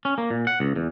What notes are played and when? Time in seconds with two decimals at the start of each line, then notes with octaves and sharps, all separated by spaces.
0.05 C#4
0.18 A#3
0.30 A#2
0.47 F#5
0.60 C#2
0.76 E2